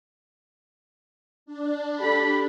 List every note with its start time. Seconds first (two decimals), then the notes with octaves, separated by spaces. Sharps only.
1.46 D4
2.01 G4 A4 B5